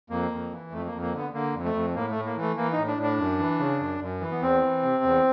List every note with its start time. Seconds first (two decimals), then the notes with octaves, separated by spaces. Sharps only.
0.10 F2 A#3
0.31 F2
0.51 E3
0.72 F2 A3
0.87 A#3
0.92 F2
1.02 A#3
1.13 D3
1.18 B3
1.33 D3 A#3
1.54 F2
1.64 A3
1.74 F2
1.95 A2 A#3
2.10 A3
2.16 A2
2.26 A#3
2.36 E3
2.41 A3
2.56 E3 A#3
2.72 D#4
2.78 A2
2.88 D4
2.98 A2 D4
3.18 F#2
3.39 E3
3.59 C#3
3.80 F#2
4.00 F#2
4.21 E3
4.31 B3
4.41 E2 C4
4.62 E3
4.83 C3
5.04 E2